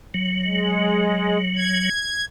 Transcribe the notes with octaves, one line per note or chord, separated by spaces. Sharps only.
F#3
G#3
G#6